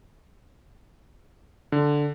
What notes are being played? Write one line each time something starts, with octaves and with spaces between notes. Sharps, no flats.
D3